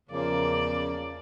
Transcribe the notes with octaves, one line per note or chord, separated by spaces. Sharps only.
E2 C#3 F3 A#3 D5